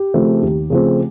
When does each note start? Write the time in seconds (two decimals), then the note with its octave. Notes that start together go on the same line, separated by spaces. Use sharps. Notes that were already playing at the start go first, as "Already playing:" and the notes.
Already playing: G4
0.14 C#3 F3 A3 C4
0.42 D#2
0.70 C#3 F3 A3 C4